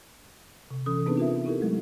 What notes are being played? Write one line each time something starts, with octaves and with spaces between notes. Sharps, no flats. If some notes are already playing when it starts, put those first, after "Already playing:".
C3
E3 C#4 A4 D#6
B3 C4 D4 D#4 G#4 B4
F4 A#4 E5
D#4 E4 G4 A4 A#4
F#3 G#3 A3